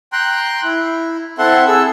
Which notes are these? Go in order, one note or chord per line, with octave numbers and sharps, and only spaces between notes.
G5 A#5 C6 F#6
E4
C4 E4 A4 E5 F#5 C6
G#4 A4 E6